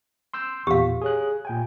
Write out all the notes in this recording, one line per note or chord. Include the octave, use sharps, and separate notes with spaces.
C6 E6 G6
E2 A#2 G4 F5
G#4 C#5 F#6
A#2 G5 G#5